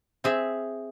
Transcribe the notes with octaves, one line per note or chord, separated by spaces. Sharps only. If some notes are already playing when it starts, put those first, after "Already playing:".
C4 G#4 E5